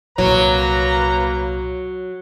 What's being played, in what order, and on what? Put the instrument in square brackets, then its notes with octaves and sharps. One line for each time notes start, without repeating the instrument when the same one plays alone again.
[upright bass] C2 A#2 [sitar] F#3 [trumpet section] A#3 B4 A#5